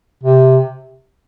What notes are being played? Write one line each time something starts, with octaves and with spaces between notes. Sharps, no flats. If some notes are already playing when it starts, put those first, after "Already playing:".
C3